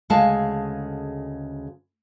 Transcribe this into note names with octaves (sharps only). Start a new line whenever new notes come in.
D2 C#3 G#3 F5 A5